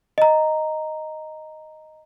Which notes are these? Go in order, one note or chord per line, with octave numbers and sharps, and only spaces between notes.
D#5 A#5